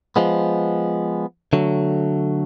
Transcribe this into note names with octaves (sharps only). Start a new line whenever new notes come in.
F3 G#3 B3
D3 F#3 A3